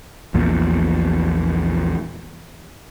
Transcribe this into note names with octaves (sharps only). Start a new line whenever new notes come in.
A#1 E2 A#2